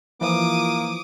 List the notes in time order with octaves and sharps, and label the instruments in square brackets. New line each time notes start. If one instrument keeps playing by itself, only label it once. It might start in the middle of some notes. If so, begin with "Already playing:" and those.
[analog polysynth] E3 F3 [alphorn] A#3 [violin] D6 D#6